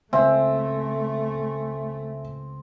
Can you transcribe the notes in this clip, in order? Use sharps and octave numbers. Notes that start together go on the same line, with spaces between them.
C#2 A3 C4 E5 G#5